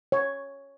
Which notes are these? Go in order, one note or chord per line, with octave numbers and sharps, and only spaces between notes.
C#5